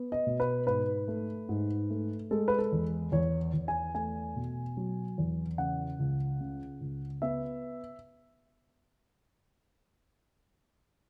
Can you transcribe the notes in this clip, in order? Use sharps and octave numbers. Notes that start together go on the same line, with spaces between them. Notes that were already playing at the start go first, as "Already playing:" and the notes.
Already playing: B3
D#5
B2
B4
G#2 B4
A3
G#2
A3
G#3 A4
B4
A4
E2
E2 C#5
E2
G#5
A3 G#5
B2
F#3
E2
C#3 F#5
C#2
C#3
C#2
B3 E5